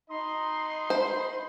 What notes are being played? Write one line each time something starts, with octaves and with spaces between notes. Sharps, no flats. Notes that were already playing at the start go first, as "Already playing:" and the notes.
D#4 D#5 B5 C6
C5